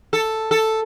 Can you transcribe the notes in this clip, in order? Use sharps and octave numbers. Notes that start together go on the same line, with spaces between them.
A4
A4